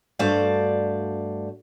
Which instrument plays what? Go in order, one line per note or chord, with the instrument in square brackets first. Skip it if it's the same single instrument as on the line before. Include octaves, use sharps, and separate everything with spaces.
[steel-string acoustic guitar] G2 A3 F#4 C5 D5 F5